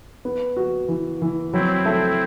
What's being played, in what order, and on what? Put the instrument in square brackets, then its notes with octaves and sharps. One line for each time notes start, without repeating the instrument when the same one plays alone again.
[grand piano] B3
F#4
E3
E3
[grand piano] F#3 [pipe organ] C4 E4
[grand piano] A3